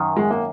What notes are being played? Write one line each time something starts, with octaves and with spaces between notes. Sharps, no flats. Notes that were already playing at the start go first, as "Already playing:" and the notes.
Already playing: F#2 D#3
G#3
A#3